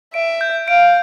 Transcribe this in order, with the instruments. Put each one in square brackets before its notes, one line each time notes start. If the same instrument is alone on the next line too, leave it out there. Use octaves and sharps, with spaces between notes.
[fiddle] E5 [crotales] D7
[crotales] G6
[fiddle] F5 [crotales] D7